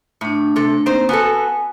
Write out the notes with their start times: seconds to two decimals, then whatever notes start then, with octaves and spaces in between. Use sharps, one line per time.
0.21 A2 A3 D4
0.56 C3 A4
0.86 A#3 C4 D#4 C5
1.09 B3 F#4 A4 G#5